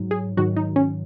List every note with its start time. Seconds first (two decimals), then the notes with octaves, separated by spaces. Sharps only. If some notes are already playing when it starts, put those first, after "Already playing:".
Already playing: G#2 F#3
0.11 G#4
0.37 G#2 D#3 F#3 F#4
0.56 D#4
0.76 C#4